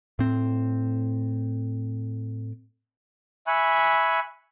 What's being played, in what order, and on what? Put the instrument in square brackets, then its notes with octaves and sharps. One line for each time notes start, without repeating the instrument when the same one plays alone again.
[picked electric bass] A2 C4
[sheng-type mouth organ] E5 G#5 B5 C#6 F#6